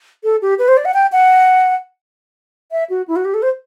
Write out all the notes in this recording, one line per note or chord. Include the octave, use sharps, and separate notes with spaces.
A4
G4
B4
C5
D5
F#5
G5
F#5
E5
F#4
E4
F#4
G4
A4
C5